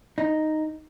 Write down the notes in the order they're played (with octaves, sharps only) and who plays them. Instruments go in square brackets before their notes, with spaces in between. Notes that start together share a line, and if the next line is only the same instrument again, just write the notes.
[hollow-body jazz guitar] D#4